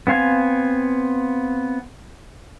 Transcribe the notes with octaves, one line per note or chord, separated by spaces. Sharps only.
B3 C4 F5 G#5